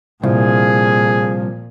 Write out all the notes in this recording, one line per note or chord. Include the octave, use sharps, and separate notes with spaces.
C2 A#2 F3 G#4